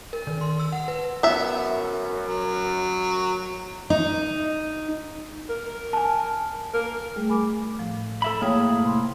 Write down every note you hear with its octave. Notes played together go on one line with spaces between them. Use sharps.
A#4
D#3
C6
E6
F#5
B4
F#2 B3 E5
F#3
D#4
A#4
G#5 A5
A#4
G3 A3 G#4
G#5 B5 D6
A2 F3
A4 E5 B5
A2 A#3 G#4 C#5 G5 F6
C3 B5 C6